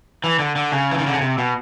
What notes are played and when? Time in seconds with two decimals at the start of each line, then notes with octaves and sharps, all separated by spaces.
0.24 E3
0.39 D3
0.56 D3
0.72 C#3
0.91 E3
0.98 D#3
1.07 D3
1.15 C#3
1.22 C3
1.38 B2